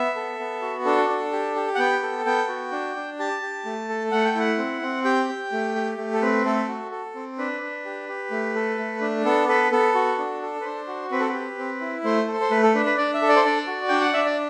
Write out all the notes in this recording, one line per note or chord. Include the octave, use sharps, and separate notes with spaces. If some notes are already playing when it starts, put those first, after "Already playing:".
Already playing: B3 E5
A4
B3
F#4
D4 A4
D4
G4
G4
F#5
B3 G5
A4
B3 G5
F#4
D4
D4
G4 A5
G4
A3
A4
A3 F#5
G5
E4 F#5
C4
C4
G4 G5
G4
A3
G4
A3
A4
C4 B4
A3 A4
F#4
A4
C4
D4 B4
D4
G4
G4
A3
A4
A3
D4
B3 A4
A4 B4
B3 A4
F#4
D4
A4
B4
D4 C5
F#4
C4 B4
A4
G4 B4
C4
E4
A3 C5
A4
C5
A3 B4
A4
D4 B4
B4
D4 D5
E5
A4
D5
C5
D4 D5
F#4
D4 G5
F#5
D4 E5
D5